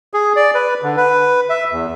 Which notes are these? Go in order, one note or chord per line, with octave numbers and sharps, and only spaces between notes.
G#4
D5
B4
D3
B4
E5
E2